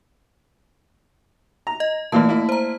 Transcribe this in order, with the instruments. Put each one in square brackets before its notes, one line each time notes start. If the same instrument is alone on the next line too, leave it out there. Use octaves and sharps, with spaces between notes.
[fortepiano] A#5
[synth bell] D#5
[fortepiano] A#2 E3 A#3 [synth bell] A3 A5
[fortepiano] A#3 E4
[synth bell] C5 A#5